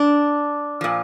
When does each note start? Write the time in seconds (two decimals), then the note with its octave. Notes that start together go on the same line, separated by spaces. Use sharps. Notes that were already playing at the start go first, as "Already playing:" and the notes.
Already playing: D4
0.81 A#2 F3